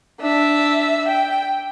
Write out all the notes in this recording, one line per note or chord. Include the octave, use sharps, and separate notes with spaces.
D4 E5
G5